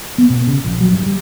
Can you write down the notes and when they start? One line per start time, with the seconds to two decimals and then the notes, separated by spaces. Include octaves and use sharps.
0.18 B3
0.30 B2
0.47 C#3
0.64 A#1
0.80 F#3
0.92 G2
1.06 G3